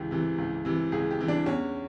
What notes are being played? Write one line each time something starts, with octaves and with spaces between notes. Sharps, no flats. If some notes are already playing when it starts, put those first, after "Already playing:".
Already playing: C#2 E3 G4 G#4
C3 E3
C#2
C3 E3
C#2 G#4
G4
C3 E3
D4
E2 C#4